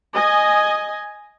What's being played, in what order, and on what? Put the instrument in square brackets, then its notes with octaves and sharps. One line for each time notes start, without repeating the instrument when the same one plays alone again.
[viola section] D#5 G#5